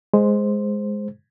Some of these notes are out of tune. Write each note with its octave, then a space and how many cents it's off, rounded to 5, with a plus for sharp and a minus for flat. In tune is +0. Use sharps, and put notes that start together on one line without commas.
G#3 +0 G#4 +0 C5 +0